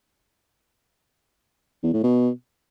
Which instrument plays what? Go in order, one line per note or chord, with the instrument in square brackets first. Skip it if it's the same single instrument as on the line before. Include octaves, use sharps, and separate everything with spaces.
[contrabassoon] E2
A2
B2